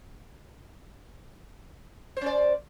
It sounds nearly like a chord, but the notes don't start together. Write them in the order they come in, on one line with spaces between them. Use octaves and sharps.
C5 C#4 D5